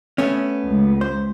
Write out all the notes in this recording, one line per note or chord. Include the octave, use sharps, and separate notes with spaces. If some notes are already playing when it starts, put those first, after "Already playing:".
A3 B3 C#4
C#2
C5